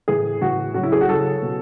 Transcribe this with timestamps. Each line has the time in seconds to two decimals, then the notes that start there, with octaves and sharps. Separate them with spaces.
0.08 A2 E3 G#4
0.41 A2 E3 F#4
0.74 C#3 F#3 F#4
0.83 E4
0.92 G#4
1.01 F#4
1.09 C#3 F#3 A4
1.42 B2